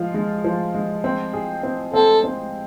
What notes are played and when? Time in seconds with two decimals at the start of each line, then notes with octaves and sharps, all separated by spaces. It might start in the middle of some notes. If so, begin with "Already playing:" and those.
Already playing: F3 G#3 F4
0.14 G#3
0.44 F3
0.75 G#3
1.04 C4
1.33 G#4
1.63 C4
1.93 C4 A4
2.24 C4